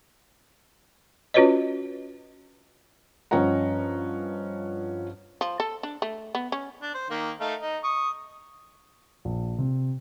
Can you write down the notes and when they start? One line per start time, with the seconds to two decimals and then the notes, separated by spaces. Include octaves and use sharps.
1.34 C#4 F4 F#4 B4 C#5 D#5
3.31 G2 F3 C#4 D#5 F#5 A#5
5.41 F3
5.60 A4
5.83 D4
6.02 A3
6.35 B3
6.52 C#4
6.82 D4
6.94 C5
7.10 D#3 A#3
7.40 A3 D#4 F5
7.61 D#4
7.84 C#6 D#6
9.25 A#1
9.58 C3